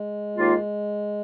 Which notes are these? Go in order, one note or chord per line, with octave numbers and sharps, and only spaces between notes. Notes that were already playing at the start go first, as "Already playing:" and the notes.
Already playing: G#3
D#2 D#3 A#3 F4